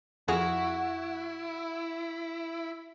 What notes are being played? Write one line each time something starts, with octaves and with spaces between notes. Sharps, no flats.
F2 E4 F#4 G#4 F6